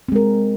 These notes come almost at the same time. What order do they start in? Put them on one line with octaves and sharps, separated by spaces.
C4 G#3 A#4